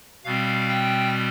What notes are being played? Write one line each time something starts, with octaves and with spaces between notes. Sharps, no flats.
B2 G3 C4 F5
G5